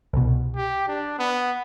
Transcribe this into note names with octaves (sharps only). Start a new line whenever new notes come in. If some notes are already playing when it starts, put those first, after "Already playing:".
C2 B2
G4
D4
B3